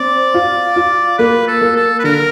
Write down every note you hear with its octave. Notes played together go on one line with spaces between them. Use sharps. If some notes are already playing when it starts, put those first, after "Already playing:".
Already playing: C4 D5
F4
F4
A#3 B4
A4
A#3
A4
B4
D3 A#4